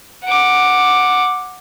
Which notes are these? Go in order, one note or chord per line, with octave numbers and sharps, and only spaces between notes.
F#5 D6